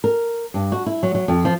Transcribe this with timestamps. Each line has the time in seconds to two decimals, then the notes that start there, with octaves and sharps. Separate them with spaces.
0.04 A#4
0.54 G2
0.72 F#4
0.86 E4
1.03 F#3
1.15 F#3
1.28 F2
1.45 F3